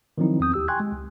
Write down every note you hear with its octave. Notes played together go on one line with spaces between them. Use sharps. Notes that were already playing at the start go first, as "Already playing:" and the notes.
D#3 F3 F#3 C4 D#4 E4
E2 C4 D#6 G6
D#2 G4 E6
G5 G#5 C6 C#6 F#6 G#6
G#3 G4
C#2